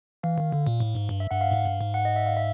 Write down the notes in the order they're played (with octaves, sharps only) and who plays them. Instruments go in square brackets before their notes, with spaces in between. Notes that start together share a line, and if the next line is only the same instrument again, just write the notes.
[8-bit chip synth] E3 [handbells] F5
[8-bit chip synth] D#3
D3
A#2
A2
G#2
G2
[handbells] E5
[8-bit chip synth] G2 [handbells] F#5
[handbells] F5
[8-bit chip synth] G#2
G2
G#2
[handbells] F#5
D#5
E5
F5
E5